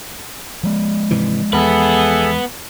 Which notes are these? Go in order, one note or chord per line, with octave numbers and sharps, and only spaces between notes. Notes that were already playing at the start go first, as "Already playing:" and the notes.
F3 G#3
G#2 C3 E3
E2 B3 G#4 A4 B4 E5